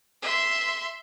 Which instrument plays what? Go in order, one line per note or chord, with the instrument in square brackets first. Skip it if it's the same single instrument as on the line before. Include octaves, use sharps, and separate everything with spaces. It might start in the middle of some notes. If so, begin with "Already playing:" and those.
[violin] E5 C6